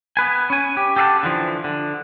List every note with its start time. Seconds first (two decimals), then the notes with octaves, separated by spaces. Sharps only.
0.17 B3 B4 G#5
0.50 C#4 G#5
0.77 G4
0.96 G4 A4 D#5 F5 F#5 A5
1.23 D3 E3 F3
1.64 D3